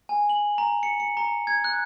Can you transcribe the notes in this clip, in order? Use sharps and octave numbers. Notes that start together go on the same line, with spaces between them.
G#5
F#7
A#5
C#7
C#7
A#5
G#6
F#6